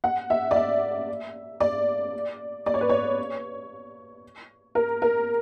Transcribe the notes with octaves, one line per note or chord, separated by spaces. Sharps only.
F#5
E5
D5
E5
D5
D5
C#5
B4
C#5
A#4
A#4